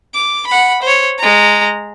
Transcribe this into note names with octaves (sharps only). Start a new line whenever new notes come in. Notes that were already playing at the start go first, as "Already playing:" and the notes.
D6
F#5 B5
C5 C#5
G#3 A#5